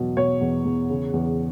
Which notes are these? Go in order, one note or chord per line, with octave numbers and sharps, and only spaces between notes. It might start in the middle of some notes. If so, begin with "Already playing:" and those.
Already playing: E2 B2 F#3
B2 C#5
E2
E2
C#3
E2